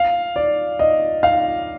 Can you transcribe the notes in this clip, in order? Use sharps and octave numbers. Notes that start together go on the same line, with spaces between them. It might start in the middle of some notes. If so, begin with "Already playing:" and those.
Already playing: F5
D5
D#5
F5